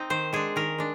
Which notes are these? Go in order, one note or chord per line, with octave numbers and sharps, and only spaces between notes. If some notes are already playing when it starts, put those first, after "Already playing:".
Already playing: C4 D#4
D#3 C5
G#3 D4 G#4
D#3 A#4
G#3 D4